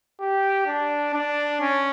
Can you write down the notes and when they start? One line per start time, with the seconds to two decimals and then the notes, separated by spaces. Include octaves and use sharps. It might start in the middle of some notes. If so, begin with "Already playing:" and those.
0.21 G4
0.67 D4
1.14 D4
1.61 C#4